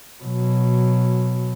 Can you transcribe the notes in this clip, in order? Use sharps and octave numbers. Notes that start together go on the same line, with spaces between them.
B2 F#3